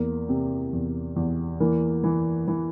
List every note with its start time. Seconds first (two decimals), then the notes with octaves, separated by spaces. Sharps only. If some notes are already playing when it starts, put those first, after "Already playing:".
Already playing: E2 A#3
0.29 C3
0.73 E2
1.16 E2
1.60 E3 A#3
2.04 E3
2.48 E3